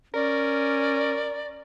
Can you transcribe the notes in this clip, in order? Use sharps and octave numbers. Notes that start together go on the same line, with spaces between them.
C#4 A#4 D5